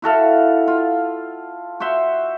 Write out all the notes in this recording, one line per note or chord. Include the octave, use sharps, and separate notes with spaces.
E4 F#4 A4 F5
F4
F#4 C5 E5 C6